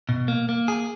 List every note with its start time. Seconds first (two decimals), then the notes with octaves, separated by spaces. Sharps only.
0.09 B2
0.28 A#3
0.49 A#3
0.68 G#4